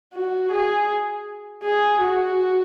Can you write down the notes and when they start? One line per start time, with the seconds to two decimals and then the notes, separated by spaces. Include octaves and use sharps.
0.14 F#4
0.52 G#4
1.63 G#4
2.01 F#4